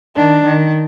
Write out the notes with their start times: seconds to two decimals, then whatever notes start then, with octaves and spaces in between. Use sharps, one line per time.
0.16 D#3 D4
0.44 D#3